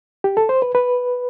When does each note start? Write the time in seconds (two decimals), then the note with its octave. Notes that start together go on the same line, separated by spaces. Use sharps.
0.24 G4
0.37 A4
0.49 C5
0.62 B4
0.75 B4